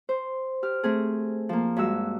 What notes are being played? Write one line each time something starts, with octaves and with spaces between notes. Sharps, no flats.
C5
G4 F6
A3 C4 G#4
F3 A#3
G2 G#3 F#4 E6